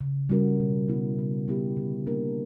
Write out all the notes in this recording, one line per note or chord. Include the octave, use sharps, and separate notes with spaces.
C#3
G3 C#4 F#4 A#4
B2
G3 B3 E4
C#3
G3 B3 E4 G4
D3
A#3 D4 A#4